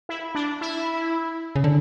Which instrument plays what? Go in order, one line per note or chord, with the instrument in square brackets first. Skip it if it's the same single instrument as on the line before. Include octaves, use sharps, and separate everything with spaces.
[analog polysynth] E4
D4
E4
[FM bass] C#3
D3